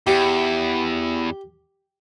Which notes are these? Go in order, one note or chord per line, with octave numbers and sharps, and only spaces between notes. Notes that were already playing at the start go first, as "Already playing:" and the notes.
E2 G4